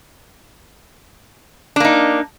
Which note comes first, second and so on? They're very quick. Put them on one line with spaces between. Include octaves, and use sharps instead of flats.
D4 A#3 D#4